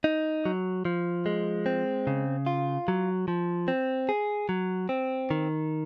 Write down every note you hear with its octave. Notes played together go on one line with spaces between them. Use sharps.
D#4
F#3
F3
G#3
C4
C#3
F4
F#3
F3
C4
G#4
F#3
C4
D#3